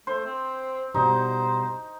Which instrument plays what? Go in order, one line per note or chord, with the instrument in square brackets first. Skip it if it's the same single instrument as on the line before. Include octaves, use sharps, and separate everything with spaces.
[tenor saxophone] A3 [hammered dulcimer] C5
[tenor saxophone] C4
[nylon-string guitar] B2 G3 [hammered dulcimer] D#4 [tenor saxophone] C5